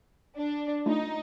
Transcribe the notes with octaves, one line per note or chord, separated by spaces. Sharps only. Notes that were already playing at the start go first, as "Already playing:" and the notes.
D4
A3 D4 D#4 F4